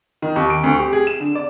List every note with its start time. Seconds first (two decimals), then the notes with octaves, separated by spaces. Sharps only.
0.22 D#3
0.36 D#2
0.50 D7
0.64 D2
0.79 G4
0.93 G#4
1.07 E7
1.20 D3
1.35 D5